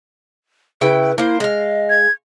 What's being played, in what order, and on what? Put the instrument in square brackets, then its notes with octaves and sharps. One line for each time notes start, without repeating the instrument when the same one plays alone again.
[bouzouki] C#3 E4 G5 [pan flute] B4
[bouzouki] A#3 C5 [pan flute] E4
[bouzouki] G#3 F5 [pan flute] D#5
[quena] G#6